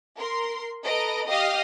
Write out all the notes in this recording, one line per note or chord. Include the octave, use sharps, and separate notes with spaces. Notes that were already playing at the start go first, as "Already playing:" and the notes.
A#4 C6
A4 B4 D#5 A#5 D7
G4 D#5 F5 D#6 F6